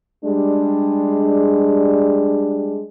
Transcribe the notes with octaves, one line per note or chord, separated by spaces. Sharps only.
G3 G#3 D4